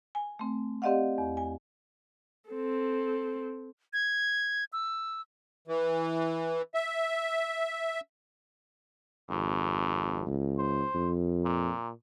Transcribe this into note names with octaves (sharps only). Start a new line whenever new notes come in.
G#5
A3 C4
C4 G4 D5 D#5 F5 F#5
E2
G#5
C4 A4
G#6
E6
E3
E5
G#1 F2
C#2
C5
F2
A#2